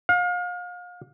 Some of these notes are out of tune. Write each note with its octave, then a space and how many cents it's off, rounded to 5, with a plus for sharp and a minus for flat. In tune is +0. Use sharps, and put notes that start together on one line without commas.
F5 +35